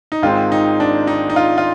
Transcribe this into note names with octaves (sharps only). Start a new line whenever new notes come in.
D#4
G#1 G#2 D#3 G#3 C4 F4
D#4
D4
D#4
D#4
F4
F4